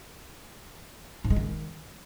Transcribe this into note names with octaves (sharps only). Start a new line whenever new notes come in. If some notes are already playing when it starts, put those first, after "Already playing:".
G#2
G#3
D#3